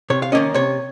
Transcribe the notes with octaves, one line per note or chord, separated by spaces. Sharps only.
C3 C#5
F5
D#3 A#3 C#4 D#5
C3 C#5